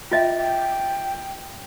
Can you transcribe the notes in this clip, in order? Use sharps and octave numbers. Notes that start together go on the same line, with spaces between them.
F4 D#5 E5 G5
G5